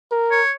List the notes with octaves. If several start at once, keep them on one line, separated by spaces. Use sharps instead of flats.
A#4
C#5